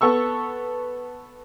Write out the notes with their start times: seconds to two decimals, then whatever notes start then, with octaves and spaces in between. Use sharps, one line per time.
0.01 B3 A4 C#6 E6